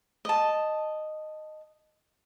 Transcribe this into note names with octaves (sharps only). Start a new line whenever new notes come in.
D#5 A5